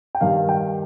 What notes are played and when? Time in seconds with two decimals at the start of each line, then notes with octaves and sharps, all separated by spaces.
0.15 G5
0.21 G2 D#3 F5
0.49 G5